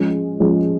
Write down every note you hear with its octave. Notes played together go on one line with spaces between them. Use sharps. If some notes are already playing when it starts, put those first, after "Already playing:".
Already playing: F3 G#3 C#4
F3 G#3 C#4